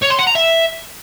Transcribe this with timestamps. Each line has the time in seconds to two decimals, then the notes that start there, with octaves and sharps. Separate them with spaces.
0.02 C#5
0.10 C6
0.19 F#5
0.27 A#5
0.35 E5